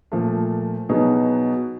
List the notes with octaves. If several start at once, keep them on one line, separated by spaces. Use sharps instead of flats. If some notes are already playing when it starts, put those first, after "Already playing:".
A#2 F3 A3
B2 F#3 B3 D#4 G#4